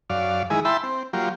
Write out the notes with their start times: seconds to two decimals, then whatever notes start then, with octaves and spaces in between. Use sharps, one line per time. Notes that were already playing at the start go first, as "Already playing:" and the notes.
0.10 F#2 D5 F5
0.50 D#3 G#3 E4 G#4
0.65 E4 E5 G5 A5 B5 C6
0.83 C4
1.13 F#3 A#3 F4 G4